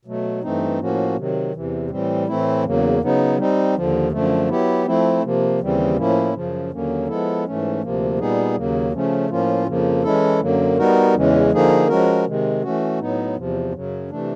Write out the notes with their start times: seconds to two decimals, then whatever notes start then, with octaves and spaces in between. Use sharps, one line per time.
0.05 B2 F#3 A3
0.43 G2 E3 A3 C4 D#4
0.79 A2 F3 A#3 C#4 F#4
1.16 C3 D#3 F#3
1.53 E2 C3 E3
1.90 A2 E3 G3 C4
2.27 A2 E3 A3 C4 E4
2.64 E2 C#3 F#3 A#3
3.02 C#3 F#3 B3 D#4
3.38 G3 C4 D#4
3.75 D#2 D3 F3
4.12 F#2 D3 F3 A3
4.49 F#3 B3 E4 G4
4.86 F3 A3 C4 E4
5.23 C3 F3 A#3
5.60 D#2 C#3 E3 G3 C4
5.96 A2 F3 A#3 C#4 E4
6.34 F#2 C#3 F3
6.70 D#2 D3 F#3 A#3 C#4
7.08 F3 G#3 B3 E4 A4
7.45 G#2 E3 A3 C#4
7.82 D2 C3 F3 A#3
8.18 A#2 G3 B3 D#4 G#4
8.56 D#2 C#3 F#3 A#3
8.92 C#3 F3 A3 C#4
9.30 A2 F3 A#3 C#4 F4
9.67 F2 C#3 F3 A#3
10.03 E3 G#3 C#4 E4 A4
10.41 F#2 D3 F#3 A#3
10.78 G3 B3 D#4 F#4 A#4
11.14 E2 C#3 E3 G#3 C#4
11.52 D3 F3 A#3 D#4 G#4
11.88 F3 G#3 C#4 F#4 A#4
12.26 C3 D#3 G#3
12.62 E3 A3 C#4 F#4
12.99 A2 F#3 B3 D#4
13.37 E2 C3 F3
13.73 F#2 C#3 F#3
14.10 C3 E3 A3 D4